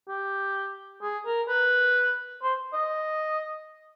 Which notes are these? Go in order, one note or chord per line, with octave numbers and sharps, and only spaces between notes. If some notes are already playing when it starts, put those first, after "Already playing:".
G4
G#4
A#4
B4
C5
D#5